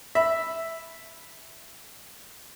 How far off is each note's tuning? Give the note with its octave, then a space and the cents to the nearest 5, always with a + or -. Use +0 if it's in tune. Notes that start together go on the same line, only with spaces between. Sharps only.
E5 +0 B5 +0